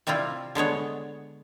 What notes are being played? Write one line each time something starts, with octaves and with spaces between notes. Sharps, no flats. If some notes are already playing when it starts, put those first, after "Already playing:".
C3 G3 C4 E4 F4
D3 G#3 B3 C#5